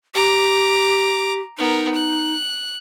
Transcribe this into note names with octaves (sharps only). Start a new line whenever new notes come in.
G4 A#5 D6
B3 D#4 A#4
F#6